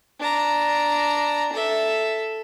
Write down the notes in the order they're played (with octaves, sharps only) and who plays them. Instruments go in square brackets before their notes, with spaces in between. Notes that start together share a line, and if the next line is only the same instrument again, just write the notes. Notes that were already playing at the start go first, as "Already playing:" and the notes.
[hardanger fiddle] D4 A#5
A4 E5